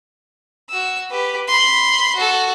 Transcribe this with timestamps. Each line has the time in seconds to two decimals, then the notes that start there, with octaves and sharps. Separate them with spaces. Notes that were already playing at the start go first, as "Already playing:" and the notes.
0.69 F#4 E6
1.10 G4 B4
1.48 B5 C6
2.16 F#4 A4